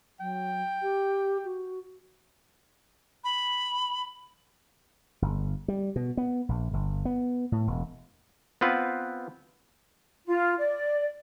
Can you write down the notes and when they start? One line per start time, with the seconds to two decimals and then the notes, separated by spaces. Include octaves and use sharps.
0.20 F#3 G5
0.82 G4
1.45 F#4
3.24 B5
5.22 G1
5.68 G3
5.96 B2
6.17 B3
6.49 A#1
6.73 G1
7.05 B3
7.52 A2
7.67 E1
8.61 B3 C4 F4 B4
10.26 F4
10.58 D5